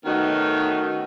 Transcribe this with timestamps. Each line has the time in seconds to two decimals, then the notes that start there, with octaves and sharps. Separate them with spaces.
0.05 D#3 A3 B3 C#4 D#4 F#4